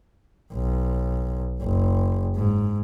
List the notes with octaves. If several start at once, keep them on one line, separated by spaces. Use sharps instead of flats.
B1
F#1
G#2